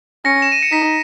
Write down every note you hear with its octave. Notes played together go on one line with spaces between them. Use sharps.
C#4 A#6 C#7
E7
D#7
C#7
D#4 B6